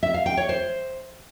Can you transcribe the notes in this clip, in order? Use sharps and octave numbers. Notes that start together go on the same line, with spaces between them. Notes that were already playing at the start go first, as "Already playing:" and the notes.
E5
F5
G5
C#5
C5